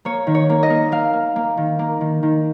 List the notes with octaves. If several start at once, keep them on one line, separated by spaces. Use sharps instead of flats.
A#3 C#5
D#3
C#5
A#3
D#5
A#3
A#3 F5
A#3
A#3
D#3
A#3
D#3
D#3